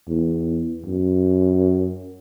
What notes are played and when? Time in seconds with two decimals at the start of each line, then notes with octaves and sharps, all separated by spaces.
0.08 E2
0.86 F#2